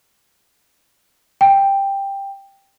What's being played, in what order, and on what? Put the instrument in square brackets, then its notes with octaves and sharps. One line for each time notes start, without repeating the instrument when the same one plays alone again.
[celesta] G5